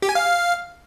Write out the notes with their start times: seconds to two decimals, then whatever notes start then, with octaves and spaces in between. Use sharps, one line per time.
0.02 G4
0.09 G#5
0.15 F5